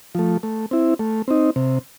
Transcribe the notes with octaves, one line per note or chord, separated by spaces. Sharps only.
F3 A3
A3
C4 E4
A3
C4 D#4
C3